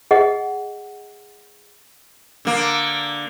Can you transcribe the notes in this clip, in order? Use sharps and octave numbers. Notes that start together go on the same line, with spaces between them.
G#4 D#5 F#5
D3 A#3